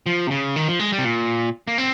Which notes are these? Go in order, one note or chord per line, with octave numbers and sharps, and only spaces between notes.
F3
C3
C#3
D#3
F3
G#3
G3
C3
A#2
A#3
C4